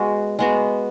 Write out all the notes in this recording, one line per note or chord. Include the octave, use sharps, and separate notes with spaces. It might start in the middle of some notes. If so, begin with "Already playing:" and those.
Already playing: G#3 B3 F#4
G#3 B3 F#4